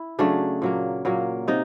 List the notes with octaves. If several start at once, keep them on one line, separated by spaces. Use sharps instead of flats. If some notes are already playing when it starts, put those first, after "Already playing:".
Already playing: E4
C#3 F#3 A3 D4
A#2 F#3 A#3
A#2 F#3 A#3
C3 D#4